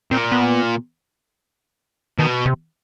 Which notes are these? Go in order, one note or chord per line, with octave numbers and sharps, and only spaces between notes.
A#2 C4
B3
B2 D#3
C3